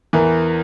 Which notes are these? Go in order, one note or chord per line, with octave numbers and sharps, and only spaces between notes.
E2 E3 A#4 E5 A#5